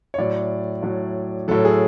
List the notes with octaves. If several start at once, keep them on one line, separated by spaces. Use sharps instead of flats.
C#5
A2 F#3 D5
A2 F#3
A2 F#3 A4
G#4